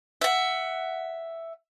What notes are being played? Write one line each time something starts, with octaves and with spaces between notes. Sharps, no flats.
E5 F#5